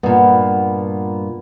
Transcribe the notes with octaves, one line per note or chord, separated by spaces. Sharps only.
G2 A#2 B3